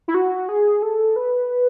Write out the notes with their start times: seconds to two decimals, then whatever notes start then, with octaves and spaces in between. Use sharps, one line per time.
0.08 E4
0.14 F#4
0.49 G#4
0.82 A4
1.16 B4